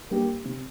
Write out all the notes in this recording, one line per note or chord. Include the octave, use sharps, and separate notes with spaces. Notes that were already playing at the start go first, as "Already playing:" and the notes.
G3 A#3 D4 G4
C3